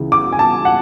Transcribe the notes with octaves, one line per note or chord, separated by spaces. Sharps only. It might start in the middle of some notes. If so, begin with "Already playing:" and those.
Already playing: C#2 C#3 E3 G#3
D6
G#5
A5
F#5